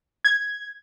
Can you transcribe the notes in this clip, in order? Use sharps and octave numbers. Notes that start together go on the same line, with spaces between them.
G#6